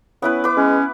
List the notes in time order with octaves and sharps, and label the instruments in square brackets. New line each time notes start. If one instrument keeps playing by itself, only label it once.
[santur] B3 E4 B4 [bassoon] C#4
[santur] B4 D6
[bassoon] G#3 [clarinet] C#4